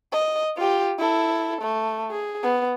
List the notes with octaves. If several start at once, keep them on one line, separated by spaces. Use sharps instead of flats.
D#5
F4 G4
E4 A4
A3
G#4
B3